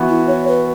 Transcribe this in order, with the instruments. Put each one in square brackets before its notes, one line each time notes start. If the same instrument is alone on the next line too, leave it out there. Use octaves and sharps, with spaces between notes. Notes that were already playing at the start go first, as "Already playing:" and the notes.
Already playing: [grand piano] E3 B3 F#4
[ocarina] E4
C#5
B4